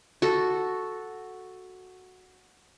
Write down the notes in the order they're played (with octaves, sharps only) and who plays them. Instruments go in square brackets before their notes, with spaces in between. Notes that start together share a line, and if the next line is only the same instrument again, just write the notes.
[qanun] F#4 A4